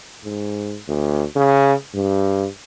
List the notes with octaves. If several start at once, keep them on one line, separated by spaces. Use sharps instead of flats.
G#2
D2
C#3
G2